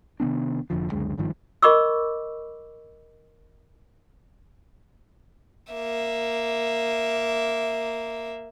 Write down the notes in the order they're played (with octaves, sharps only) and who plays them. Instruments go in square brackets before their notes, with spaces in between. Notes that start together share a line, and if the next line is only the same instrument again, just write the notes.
[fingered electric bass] C3 D#3 B3 D4
F1 F2 D3 F3
C#2 F#2 D3 G#3
G#1 G2 D#3 F3
[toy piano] A#4 D#5 B5 C#6 D6 E6
[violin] A#3 E5